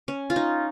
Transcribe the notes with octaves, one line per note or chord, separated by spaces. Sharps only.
C#4
F4
D#4